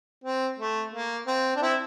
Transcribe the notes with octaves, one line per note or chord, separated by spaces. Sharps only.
C4
A3
A#3
C4
D4
C4 E4